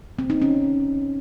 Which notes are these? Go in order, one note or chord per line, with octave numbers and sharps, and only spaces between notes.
C4
D#4
C#4